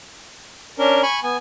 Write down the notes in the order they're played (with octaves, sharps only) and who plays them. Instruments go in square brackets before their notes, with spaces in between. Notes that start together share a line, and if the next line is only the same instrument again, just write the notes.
[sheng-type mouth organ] C#4 D4 A#4
G#5 B5 C#6
B3 G#5